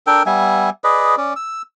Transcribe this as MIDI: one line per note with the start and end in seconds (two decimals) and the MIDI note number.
0.07 0.23 62
0.07 0.23 69
0.07 0.23 70
0.07 0.23 79
0.26 0.70 55
0.26 0.70 59
0.26 0.70 76
0.26 0.70 80
0.84 1.15 68
0.84 1.15 71
0.84 1.15 74
0.84 1.15 75
1.17 1.34 61
1.17 1.34 74
1.36 1.62 88